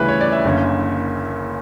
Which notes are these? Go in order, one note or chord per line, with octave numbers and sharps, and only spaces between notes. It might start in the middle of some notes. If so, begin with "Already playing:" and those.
Already playing: D2 C#3 E3 G3 C#4 B4 E5
C#5
D5
E5
F#1 F#2 D3 A#3 C#4